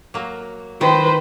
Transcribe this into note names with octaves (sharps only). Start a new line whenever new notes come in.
F#3 A#3
D#3 B4 C5